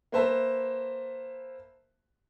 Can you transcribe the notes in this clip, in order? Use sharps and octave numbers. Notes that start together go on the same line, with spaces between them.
A#3 B4 C5 E5 A5